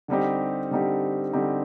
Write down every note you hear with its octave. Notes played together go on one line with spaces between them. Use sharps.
D3 G3 C4 D#4 G4
D3 G3 C4 D#4 G4
D3 G3 C4 D#4 G4